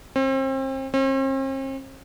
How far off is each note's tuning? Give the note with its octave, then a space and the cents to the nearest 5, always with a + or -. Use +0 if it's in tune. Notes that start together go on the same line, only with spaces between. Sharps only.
C4 +35
C4 +45